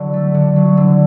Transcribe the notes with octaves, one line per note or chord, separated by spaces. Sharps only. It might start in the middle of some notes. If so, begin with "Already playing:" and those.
Already playing: D3 F#3
A3
D3
F#3
D3